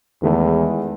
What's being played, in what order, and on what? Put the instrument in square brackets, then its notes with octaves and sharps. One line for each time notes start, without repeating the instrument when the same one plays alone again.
[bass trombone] E2 [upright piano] D#3 G#3 A3